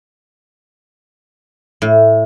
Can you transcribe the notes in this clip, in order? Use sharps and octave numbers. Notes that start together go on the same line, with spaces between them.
A2